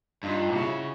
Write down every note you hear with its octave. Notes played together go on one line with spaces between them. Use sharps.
G2 D#4 F4
C#3 E4 F#4